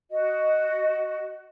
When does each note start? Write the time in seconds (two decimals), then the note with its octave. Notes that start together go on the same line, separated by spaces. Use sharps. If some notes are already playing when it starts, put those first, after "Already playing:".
0.10 F#4 D#5